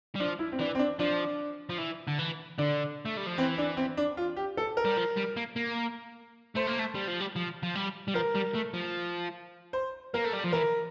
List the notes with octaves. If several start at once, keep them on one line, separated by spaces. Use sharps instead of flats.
G3
F3 D4
E4
C4
E3 D4
C4
D4
F3 D4
F3
E3
D3
E3
D3 D4
A3
G3
F3
E3 C4
D4
C4
D4
F4
G4
A4
A#4
G3
F3
G3
A#3
A#3
A3 C5
A#3
A3
G3
F3
G3
F3
F3
G3
G3
F3 A#4
G3
A3
F3
C5
A#3 A#4
A3
G3
F3
E3 A#4